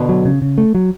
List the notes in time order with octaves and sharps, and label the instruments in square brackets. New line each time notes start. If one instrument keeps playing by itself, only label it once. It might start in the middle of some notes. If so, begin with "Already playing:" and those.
Already playing: [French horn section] B2 D3
[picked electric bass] F#3
C#3
C#3
A3
F#3